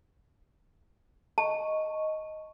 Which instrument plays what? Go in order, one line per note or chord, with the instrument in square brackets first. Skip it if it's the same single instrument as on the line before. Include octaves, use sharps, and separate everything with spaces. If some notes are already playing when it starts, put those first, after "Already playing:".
[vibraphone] D#5 C#6 [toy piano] A5